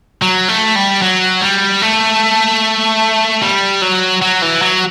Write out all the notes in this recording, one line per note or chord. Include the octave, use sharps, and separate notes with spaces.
F#3
A3
G3
F#3
G3
A3
G3
F#3
F#3
E3
F#3